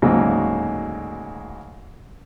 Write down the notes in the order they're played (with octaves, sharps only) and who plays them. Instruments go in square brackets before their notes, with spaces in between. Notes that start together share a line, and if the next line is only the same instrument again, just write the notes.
[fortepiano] D2 G#2 C#3 F#3 A#3